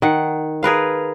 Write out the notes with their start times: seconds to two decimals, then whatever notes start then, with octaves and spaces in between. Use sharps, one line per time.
0.02 D#3 F#5
0.63 G#4 A#4 B4 F5